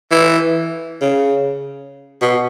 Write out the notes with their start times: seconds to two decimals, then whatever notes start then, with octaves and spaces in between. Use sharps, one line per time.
0.11 E3
1.02 C#3
2.22 B2